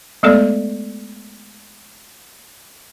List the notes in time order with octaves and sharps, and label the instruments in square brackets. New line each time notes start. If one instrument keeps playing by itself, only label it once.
[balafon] G#3 A3 B3 A4 D5